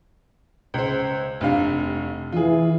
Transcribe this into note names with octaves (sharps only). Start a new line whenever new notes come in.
C#2 C5
F1 G2 F5
E3 F4 G#4